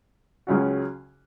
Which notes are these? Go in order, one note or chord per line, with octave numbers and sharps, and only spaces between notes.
C#2 C#3 F#3 C#4 F#4